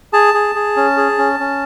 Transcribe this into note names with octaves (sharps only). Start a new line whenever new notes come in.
G#4 A5
G#4
G#4
C#4
G#4
C#4
C#4